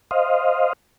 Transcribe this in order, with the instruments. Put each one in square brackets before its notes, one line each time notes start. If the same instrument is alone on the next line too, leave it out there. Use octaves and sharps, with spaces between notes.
[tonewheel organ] C5 D#5 F5